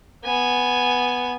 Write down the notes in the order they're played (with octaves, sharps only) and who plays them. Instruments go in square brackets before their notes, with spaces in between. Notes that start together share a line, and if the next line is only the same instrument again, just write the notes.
[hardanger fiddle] B3 G#5